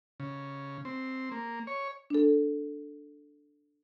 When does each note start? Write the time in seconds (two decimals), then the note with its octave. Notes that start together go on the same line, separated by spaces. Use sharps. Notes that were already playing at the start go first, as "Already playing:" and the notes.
0.20 C#3
0.85 C4
1.31 A#3
1.67 C#5
2.10 D4 A4